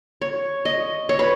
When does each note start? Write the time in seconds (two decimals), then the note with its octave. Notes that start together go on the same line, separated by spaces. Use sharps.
0.21 C#5
0.65 D#5
1.09 C#5
1.19 B4